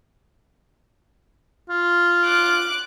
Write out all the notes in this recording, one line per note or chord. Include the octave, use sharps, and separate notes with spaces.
F4
D6 F#6